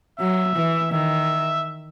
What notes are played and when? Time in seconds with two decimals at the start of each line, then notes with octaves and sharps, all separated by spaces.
0.20 F#3 E5
0.55 E3
0.92 D#3 E5